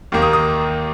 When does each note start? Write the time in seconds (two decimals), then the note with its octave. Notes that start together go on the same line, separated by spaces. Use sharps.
0.12 D#2 D#3 A#3
0.22 D#6
0.33 D#6